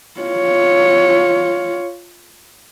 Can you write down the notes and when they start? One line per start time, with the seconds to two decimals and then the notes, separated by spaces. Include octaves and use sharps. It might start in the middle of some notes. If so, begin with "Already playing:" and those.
0.20 F4 C#5